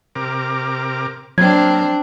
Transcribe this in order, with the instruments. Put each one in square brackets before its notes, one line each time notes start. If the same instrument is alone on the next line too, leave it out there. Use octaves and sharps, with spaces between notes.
[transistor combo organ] C3 A#4 D6
[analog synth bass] F#3 [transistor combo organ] A#3 [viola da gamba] C4 D4 [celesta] G#6